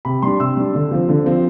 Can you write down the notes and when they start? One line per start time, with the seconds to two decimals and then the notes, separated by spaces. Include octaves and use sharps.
0.05 C3 B5
0.22 G3 D4 C6
0.40 C3 E6
0.57 G3 D4
0.75 D3
0.91 F3 C4
1.09 D3
1.26 F3 C4